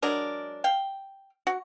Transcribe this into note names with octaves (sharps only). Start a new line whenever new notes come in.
F#3 G#3 D4 A#4
F5 G5
F#4